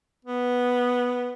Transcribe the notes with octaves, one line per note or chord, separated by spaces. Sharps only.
B3